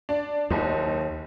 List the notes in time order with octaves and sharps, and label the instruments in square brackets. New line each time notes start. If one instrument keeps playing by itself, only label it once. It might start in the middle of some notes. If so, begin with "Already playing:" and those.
[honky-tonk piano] D4 D5
[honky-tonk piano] F#1 D#4 [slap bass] D#2